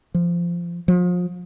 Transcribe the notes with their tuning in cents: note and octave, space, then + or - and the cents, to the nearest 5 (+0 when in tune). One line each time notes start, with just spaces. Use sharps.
F3 -15
F3 +35